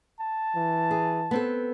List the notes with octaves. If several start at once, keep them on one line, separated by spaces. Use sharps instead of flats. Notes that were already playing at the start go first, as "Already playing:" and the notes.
A5
E3
G#4
B3 C4 A4